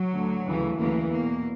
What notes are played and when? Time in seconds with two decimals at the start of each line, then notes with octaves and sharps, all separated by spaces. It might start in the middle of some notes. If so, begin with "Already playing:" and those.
Already playing: F#3
0.13 D2 D3
0.45 D2 C#3 E3
0.77 D2 C#3 E3 A#3
1.10 E2 B2 A#3